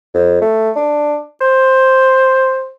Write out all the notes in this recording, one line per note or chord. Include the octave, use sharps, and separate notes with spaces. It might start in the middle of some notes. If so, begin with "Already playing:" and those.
F2
A3
D4
C5